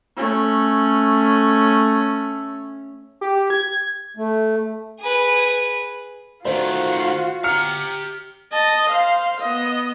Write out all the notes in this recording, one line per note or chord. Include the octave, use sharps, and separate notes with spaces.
A3 C#4
G4
G#6
A3
G#4 B4
D#3 A3 F4 F#4 C5
G4 A#5 F6 C#7
D#5 A5
C5 F5
B3 D#5